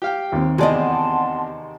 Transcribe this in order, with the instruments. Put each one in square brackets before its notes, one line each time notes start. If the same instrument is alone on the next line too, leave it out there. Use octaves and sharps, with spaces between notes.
[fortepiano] G4 F5 G5
[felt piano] D#2 C4
[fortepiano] E2 C3 [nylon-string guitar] G#4 D5 D#5 [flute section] F#5 A5 C6